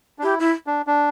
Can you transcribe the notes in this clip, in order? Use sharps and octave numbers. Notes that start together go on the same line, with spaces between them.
D4
E4 G4
E4
D4
D4